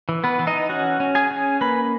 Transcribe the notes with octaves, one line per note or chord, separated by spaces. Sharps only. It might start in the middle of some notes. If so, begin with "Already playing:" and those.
E3
B3 B4
E3
D#4 D#5
C#4 F#4 F#5
C#4
G#4 G#5
C#4
A#3 B4 B5